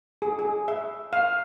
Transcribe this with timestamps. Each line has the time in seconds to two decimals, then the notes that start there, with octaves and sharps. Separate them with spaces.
0.22 G#4
0.39 G#4
0.68 E5
1.13 F5